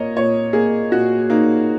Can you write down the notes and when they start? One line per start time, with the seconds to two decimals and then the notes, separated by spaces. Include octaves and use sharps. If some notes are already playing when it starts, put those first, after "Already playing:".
Already playing: A#2 A#3 C#5 D#5
0.16 A#2 C#5
0.53 A#3 G#4
0.91 A#2 F#4
1.30 A#3 D#4